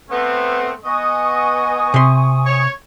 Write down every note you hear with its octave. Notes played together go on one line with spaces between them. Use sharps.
A3 B3 C4
B3 D#5 G#5 C#6 D#6
C3 C6
C#5